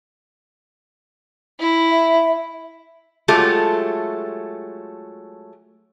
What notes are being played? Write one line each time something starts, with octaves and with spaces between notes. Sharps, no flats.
E4
E5
F#3 G#3 A3 F4 G4 A4